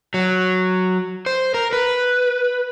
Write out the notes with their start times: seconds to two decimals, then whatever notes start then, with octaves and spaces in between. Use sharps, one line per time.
0.14 F#3
1.26 C5
1.54 A#4
1.73 B4